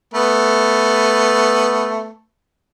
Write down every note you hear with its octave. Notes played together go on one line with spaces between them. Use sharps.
A3 B3 B4